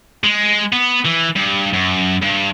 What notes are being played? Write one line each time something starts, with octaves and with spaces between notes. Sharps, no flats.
G#3
B3
E3
G2
F#2
G2